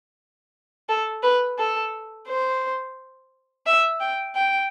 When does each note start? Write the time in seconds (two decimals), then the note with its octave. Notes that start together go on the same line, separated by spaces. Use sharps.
0.89 A4
1.23 B4
1.58 A4
2.28 C5
3.66 E5
4.01 G5
4.35 G5